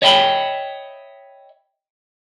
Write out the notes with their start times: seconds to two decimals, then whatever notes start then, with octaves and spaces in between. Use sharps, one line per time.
0.02 C#5 D#5 E5 G5 A#5 B5